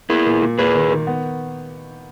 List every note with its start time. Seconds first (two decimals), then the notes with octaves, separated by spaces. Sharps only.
0.10 A#3 E4 G#4
0.26 A#2
0.42 A#2
0.58 A#3 G#4 B4
0.75 D#3
0.91 D#3
1.07 B3